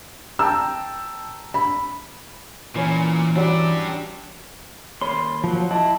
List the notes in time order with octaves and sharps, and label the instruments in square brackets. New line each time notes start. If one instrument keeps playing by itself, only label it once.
[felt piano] G5 A5 E6 [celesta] A#5
[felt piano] B5
[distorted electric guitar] A#2 [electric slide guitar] E3 [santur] C#4 C#5 D5
[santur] F#3 G3 E6 [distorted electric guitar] D4 G4
[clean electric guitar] D#2 C#5 B5 [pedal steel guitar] C6
[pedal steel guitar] F3 F#3
[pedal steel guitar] E4 [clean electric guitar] D#5 A5